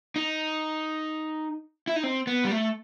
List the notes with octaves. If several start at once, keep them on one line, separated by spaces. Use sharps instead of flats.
D#4
E4
D#4
C4
B3
G3
A3